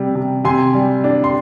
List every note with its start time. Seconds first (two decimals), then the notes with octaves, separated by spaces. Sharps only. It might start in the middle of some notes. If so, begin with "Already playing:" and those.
Already playing: C3 G3
0.15 C3
0.44 C3 G#5 C6
0.74 G3
1.04 D4
1.24 C6